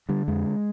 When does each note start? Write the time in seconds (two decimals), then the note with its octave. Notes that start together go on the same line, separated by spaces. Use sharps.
0.09 D3 G3
0.28 F2 G#3